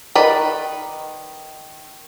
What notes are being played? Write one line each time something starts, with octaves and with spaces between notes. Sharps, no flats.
D#3 B4 D5